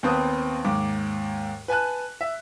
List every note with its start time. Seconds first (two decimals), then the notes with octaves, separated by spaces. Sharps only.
0.03 D#2 B3 C4 B4 A5 D#6
0.64 D#2 G#2 D6
1.68 B4 G#5 A5 F#6
2.21 E5